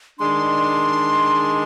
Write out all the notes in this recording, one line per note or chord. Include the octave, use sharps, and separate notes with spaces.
D#3 G#3 D4 C6